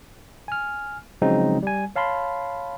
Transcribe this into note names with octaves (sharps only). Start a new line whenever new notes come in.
G#5 F6
C#3 F3 F#3 G#3 C4 D#4
G3 G#5
C#5 F5 A5 B5 C6